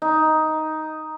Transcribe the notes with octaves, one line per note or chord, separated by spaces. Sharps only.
D#4